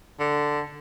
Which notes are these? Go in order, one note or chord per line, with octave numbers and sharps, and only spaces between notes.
D3